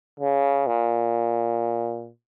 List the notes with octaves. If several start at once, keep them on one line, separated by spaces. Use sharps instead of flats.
C#3
A#2